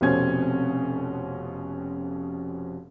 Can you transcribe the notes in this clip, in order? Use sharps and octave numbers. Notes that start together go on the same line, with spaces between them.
F1 F2 B2 C4 C#4 G#6